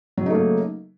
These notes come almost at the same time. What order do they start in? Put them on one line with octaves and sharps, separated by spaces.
F#3 C#3 D#4 A3 A#3